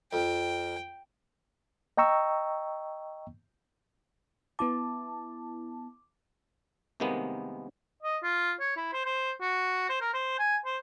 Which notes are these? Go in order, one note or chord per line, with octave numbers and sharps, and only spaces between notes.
F2 G5
D#5 G5 A#5 C#6 E6
B3 E4 A5 D6
C2 C3 D#3 G#3 A#3 B3
D#5
F4
C#5
E4
C5
C5
F#4
C5
A#4
C5
G#5
C5